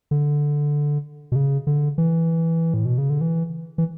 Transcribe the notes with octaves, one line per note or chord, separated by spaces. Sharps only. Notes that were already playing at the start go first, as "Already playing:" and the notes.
D3
B2
C#3
D3
E3
A2
B2
C#3
D3
E3
E3